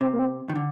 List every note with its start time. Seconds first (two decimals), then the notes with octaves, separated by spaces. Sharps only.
0.01 C3 C4
0.13 A#3
0.19 C4
0.49 D#3
0.55 D3